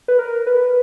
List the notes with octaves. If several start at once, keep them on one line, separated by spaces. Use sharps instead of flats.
B4
A#4
B4